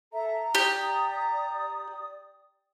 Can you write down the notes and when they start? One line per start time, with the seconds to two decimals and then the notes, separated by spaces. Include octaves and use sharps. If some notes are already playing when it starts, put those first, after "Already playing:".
0.12 A4 E5 A#5
0.55 G4 D5 D#6